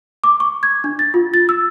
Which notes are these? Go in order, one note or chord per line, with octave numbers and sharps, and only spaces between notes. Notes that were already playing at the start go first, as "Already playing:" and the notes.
D6
C#6
G#6
D4
A6
F4
A6
E6